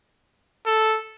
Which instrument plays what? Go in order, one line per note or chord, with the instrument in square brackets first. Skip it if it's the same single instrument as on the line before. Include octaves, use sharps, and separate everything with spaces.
[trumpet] A4